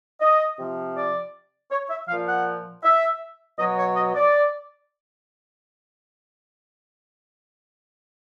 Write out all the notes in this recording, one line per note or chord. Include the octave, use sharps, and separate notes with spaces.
D#5
C3 F3
D5
C#5
E5
A#2 F3 F5
F#5
E5
B2 F#3 D#5
C#5
D#5
D5